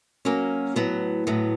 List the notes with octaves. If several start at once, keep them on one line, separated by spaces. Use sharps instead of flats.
F#3 A#3 C#4 F#4 A#4
A2 F#3 B3
A2 F#3 B3